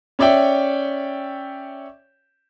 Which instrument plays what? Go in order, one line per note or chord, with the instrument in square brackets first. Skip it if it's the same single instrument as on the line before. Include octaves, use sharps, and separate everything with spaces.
[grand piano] C#4 C#5 D5 E5 G5